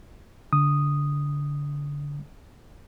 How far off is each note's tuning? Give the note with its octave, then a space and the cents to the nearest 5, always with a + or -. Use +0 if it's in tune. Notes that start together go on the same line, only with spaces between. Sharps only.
D3 -25 D#6 -5